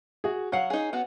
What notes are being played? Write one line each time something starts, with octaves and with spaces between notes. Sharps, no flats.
F#4 G#4
F#3 C#5 F5 F#5 C7
D#4 G#4
B3 F#4